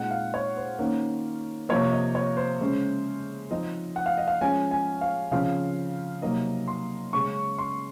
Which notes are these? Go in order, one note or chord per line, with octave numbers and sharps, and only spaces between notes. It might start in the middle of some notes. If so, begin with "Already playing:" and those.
Already playing: A#2 G#3 C4 D#4 F#5
F5
C#5
C5
D#3 A#3 C#4
C3 F3 A#3 C#5
D#5
C#5
C5
C#3 G#3 C#4
F3 C4 D#4 D#5
F#5
F5
D#5
F5
F3 G#3 C#4 G#5
G#5
F5
C#3 F3 C4 F5
C3 F#3 A#3 D#4 D#5
C6
C#3 G#3 C#4 C#6
C6